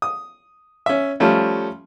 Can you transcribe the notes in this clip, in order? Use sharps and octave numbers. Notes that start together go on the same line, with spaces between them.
D#6
C#4 E5
F3 G3 A3 C#4